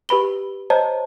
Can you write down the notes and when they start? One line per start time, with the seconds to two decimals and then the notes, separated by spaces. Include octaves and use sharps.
0.09 G4 B4 B5 G7
0.70 C5 C#5 D#5 A5 A#5